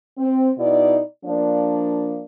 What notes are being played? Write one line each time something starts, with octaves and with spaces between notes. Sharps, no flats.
C4
B2 D#4 E4 D5
F3 A#3 D4